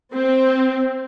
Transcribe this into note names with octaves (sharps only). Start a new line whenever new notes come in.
C4